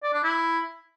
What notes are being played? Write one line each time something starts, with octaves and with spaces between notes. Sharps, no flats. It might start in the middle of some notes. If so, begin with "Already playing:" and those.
D5
D4
E4